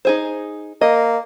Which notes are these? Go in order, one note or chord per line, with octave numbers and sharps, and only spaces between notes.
D#4 G#4 C5
A#3 D#5